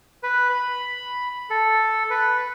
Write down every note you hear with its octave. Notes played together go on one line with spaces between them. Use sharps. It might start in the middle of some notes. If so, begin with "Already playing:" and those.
B4
B5
A4
B4